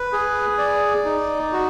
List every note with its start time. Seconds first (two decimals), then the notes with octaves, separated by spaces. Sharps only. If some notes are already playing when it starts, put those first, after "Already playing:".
Already playing: B4
0.13 G#4
0.58 D5
1.05 D#4
1.52 F#4